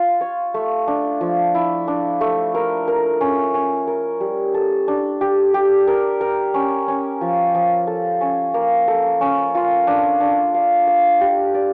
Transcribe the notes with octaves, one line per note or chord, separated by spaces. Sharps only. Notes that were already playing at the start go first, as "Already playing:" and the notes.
Already playing: F4
C#5
A3
D4
F3
E4
D4
A3
A#4
A#4
C#4
C#4
A#4
G3
A4
D4
G4
G4
A#4
A#4
C#4
C#4
F3
F3
A4
C#4
A#3
A4
C#4
F4
D4
D4
F5
F5
G4
D5